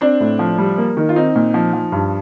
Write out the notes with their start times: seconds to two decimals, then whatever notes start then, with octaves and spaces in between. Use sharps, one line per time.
0.01 C4 D4
0.20 A2
0.39 F3
0.58 G3
0.78 A#3
0.97 D#3
1.09 F4
1.16 C4 D#4
1.36 A#2
1.54 F3
1.73 F3
1.92 G2